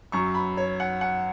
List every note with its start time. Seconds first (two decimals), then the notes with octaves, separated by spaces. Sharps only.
0.12 F#2 F#3 C#6
0.34 B5
0.57 C#5
0.80 F#5
1.01 F#5